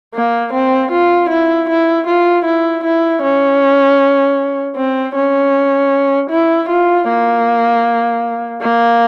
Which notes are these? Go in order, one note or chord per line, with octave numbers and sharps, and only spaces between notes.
A#3
C4
F4
E4
E4
F4
E4
E4
C#4
C4
C#4
E4
F4
A#3
A#3